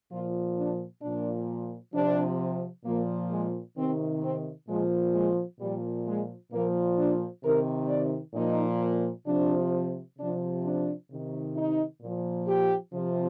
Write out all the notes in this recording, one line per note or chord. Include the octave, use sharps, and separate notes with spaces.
A#2 F3 F4
D4
A#2 F3 D4
C3 F3 D4
A#2 F3 A#3
G#3
C3 D#3 C4
C4
A#2 F3 G#3
G#3
A#2 F3 G3
G#3
A#2 F3 A#3
D4
C3 D#3 A#4
D5
A#2 F3 D#4
C3 F3 D4
C3 F3 D4
D4
C3 D#3
D#4
A#2 F3
G4
C3 F3